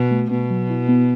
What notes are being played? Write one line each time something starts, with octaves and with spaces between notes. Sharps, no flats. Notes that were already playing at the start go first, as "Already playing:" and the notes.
Already playing: B2 F#4
A3
B2 B3
F#3
E4
B3